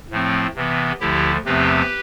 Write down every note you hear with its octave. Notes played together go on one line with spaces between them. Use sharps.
A2 F3 A3 C4
C3 E3 B3
D2 D3 F3 E4 G4
E2 C3 F3 A3 C4 G4 B4